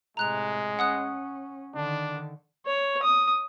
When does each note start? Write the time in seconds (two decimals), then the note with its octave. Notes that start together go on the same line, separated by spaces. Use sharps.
0.17 A2 C3 G#3 A#5 F#6 F7
0.79 C#4 F#5 D#6 F#6
1.75 D3 D#3 D4
2.66 C#5
3.03 D#6